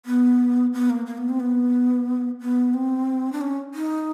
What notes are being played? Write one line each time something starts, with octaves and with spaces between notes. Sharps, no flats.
B3
B3
A#3
A#3
B3
C4
B3
B3
C4
D4
C#4
D#4